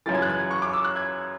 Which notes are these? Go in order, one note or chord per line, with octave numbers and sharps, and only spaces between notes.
F#2 C#3 E3 A6
G#6
F#6
G#6
C#6
D6
E6
F#6
G#6